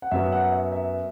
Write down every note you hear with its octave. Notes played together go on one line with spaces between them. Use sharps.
F#5
F#2 F#3 B3 E5
F#5
E5
E5